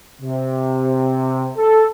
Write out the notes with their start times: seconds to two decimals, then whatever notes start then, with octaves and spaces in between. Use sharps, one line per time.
0.22 C3
1.57 A4